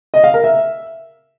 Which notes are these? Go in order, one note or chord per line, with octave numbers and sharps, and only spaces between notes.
D#5
F5
A#4
E5